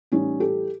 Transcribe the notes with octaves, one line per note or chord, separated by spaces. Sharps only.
A2 E3 G3 C#4 D#4
G4 A4